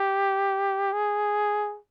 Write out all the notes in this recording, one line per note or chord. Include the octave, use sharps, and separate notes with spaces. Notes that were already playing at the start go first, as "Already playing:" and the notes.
Already playing: G4
G#4